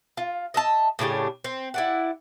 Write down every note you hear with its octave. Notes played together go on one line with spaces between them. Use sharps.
F4
D#5 E5 A5
A2 C#3 D4 G4
C4
E4 D5 F#5